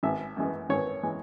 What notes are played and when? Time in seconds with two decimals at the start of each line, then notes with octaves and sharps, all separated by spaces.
0.03 G#1 E5
0.37 F#2 E3 G#3
0.69 G#1 C#5
1.03 E3 G#3